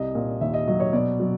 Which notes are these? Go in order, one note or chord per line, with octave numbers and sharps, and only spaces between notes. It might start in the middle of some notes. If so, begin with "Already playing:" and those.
Already playing: C2 D#5
A#2
D#2 E5
D#5
F#3 D#5
C#5
B2 D5
F#3